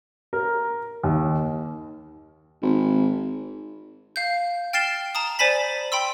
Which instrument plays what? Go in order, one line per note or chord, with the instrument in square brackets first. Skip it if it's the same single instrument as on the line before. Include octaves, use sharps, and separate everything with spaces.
[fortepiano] A#4
D#2
[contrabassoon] G#1
[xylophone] F5 G6
G5 F6 A6 C7 E7 G7
A5 A#5 D#6
C5 D5 G#5 A5 B5 B6
G5 B5 C6 E6